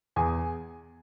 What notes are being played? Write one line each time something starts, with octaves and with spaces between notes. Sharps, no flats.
E2 G#4 G#5